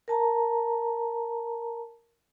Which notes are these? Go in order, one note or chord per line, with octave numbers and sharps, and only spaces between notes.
A#4 A5 A#5